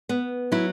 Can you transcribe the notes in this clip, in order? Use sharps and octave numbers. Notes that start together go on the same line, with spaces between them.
B3
F#3 E4